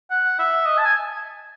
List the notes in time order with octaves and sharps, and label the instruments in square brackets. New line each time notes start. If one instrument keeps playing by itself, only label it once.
[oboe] F#5
E5
D#5
A5
G#5